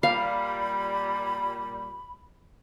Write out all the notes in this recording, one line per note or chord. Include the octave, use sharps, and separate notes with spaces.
A#2 G3 F5 B5